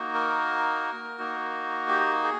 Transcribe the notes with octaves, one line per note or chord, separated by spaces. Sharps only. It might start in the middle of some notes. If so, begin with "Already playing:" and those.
Already playing: A#3 D#4 F#4
A#4
A#3 D#4 F#4
G4
G#4